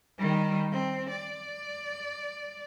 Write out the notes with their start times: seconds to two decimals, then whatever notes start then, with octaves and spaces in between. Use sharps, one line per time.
0.18 D#3 G3
0.72 C4
1.10 D5